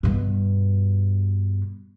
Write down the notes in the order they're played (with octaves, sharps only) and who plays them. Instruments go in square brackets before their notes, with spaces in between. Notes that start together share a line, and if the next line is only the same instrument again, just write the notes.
[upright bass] G2 B2